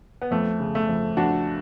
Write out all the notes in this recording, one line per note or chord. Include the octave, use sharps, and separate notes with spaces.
B3
F2 A3
C#3
A3
F2
F2 D4 F#4